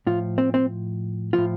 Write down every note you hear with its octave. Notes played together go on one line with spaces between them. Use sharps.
A2 F3 F4
C4
C4
A2 F3 F4